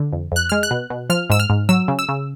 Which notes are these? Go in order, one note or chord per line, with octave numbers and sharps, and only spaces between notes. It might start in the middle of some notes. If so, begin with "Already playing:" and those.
Already playing: D3
F2
F2 F#6
G#3 F6
F#6
B2
B2
F3 F6
G#2 E6
F6
G#2
F#3 E6
C#3
E6
C#3